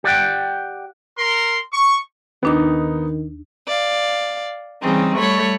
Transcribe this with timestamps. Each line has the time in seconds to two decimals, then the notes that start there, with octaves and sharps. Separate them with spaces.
0.04 G4 D5 E5 F#5 G5
1.18 A#4 C6
1.73 C#6
2.43 D#2 D#3 B3 D4 D#4 D6
3.65 D5 F5
4.82 C#3 E3 G3 C4 D#4
5.17 G3 A3 C#5 B5 C#6